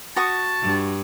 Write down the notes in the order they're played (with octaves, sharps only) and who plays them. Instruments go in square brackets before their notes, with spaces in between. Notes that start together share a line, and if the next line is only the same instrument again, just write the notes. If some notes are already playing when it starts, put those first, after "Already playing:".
[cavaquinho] F#4 C#6 D#6 [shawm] A5
[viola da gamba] G2